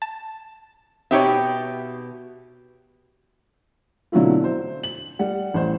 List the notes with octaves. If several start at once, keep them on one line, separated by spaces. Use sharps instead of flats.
A5
B2 C4 D#4 G4 C#5 E5
B2 D3 F#3 C4 E4 F4
C5
F#7
G3 F#5
A1 C5